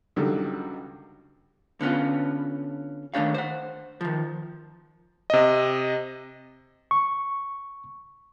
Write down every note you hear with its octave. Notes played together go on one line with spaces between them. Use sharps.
C#2 D3 D#3 F#3 G3 A4
D3 B3 C#4 F4
D#3 A3 D4 C#5 F5
C5 F#5
D#3 F3
C3 D#5
C#6